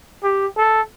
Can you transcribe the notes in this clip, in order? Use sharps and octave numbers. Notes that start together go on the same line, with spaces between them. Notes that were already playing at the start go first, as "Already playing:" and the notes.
G4
A4